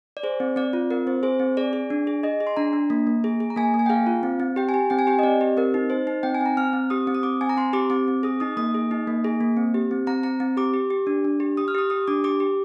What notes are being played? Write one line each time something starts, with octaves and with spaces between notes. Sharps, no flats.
D5
G#4 C5
C4
C4 D5
F4
C4 A#4
C4 C5
G#4 C5
C4
G#4 D5
G#4
D4
G#4
G#4 D#5
G#4
C6
D4 A#5
D4
A#3
A#3
G#4
G#4
A#5
A#3 G#5
A#3
G#5
G5
G#4 F5
F4
C4
C4
G4 G5
G#5
G4
C4 G5
G#5
G4 G5
D#5
C4 D5
G4
C4 A#4
D#4
D#4 C5
D#4
C4 G5
G#5
C4 A#5
C4 F6
C4
G4 D#6
C4
D#6
C4 D6
C4 G#5
A#5
C4 C6
G4 D6
C4 D6
C4
G#4 D#6
D#4 D#6
A#3 D#6
G#4
D#4
A#3
G#4
A#3
C4
G4
C4
C4 A#5
C4 A#5
C4
G4 D6
G4
G4
D4
D4
G4
G4 D#6
F6
G4 D#6
G4 D#6
D4 D6
G4 D6
G4